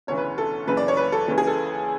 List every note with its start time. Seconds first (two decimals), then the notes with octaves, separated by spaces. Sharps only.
0.07 E1 D2 C#3 E3 C#5
0.17 B4
0.38 A4
0.67 F#1 F#2 C#3 E3 B4
0.77 D5
0.88 C#5
0.97 B4
1.12 A4
1.28 C#2 C#3 E3
1.38 G#4
1.47 A4